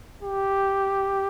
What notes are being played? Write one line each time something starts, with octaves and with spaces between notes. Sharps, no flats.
G4